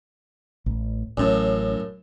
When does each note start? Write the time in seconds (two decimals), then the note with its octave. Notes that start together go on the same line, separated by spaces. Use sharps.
0.66 A1
1.17 A1 F#2 A2 C#4